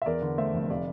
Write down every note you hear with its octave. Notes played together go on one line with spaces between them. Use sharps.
E5
E2 A#4 D5
D3
A3 C5 E5
F1
C3 D5 F5